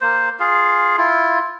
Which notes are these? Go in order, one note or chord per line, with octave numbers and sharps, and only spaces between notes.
A#3 C5
F4 G#4 F5
E4 F4